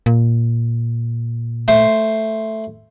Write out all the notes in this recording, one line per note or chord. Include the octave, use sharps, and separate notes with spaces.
A#2
A3 C5 C6